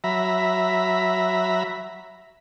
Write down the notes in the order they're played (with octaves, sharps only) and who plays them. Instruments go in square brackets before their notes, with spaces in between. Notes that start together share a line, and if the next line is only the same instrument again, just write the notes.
[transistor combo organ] F#3 E5 A#5 B5